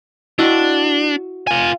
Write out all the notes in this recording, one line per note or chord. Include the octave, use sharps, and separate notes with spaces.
D4 E4 F#4 D#5
F4 G#5